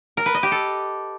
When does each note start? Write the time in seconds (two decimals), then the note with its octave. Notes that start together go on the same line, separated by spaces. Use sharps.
0.17 A#4
0.26 B4
0.34 D#5
0.43 G4
0.51 A4